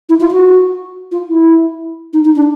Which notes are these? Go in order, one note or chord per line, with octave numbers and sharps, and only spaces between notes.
E4
F4
F#4
F4
E4
D#4
D#4
D4